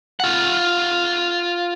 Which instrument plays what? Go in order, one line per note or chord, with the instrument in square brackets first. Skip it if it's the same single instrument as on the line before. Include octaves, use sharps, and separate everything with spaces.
[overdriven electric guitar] F4 F#5